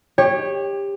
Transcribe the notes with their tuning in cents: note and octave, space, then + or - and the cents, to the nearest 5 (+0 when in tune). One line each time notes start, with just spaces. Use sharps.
G4 +20 C#5 -15